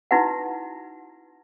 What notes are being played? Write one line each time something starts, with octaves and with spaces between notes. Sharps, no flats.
D#4 E4 F#4 B4 F#5